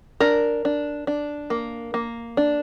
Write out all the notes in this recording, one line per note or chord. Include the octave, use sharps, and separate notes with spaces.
D4 A#4
D4
D4
A#3
A#3
D4